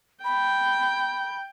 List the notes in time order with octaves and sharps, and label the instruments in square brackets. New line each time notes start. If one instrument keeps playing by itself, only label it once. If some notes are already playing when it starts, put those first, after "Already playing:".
[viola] G5 [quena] B5